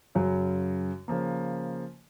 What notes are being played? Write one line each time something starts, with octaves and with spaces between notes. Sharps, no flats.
F#2 C#3 F#3
C#3 F3 A#3